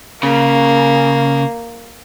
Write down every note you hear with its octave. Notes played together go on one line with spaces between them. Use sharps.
C#3 A#3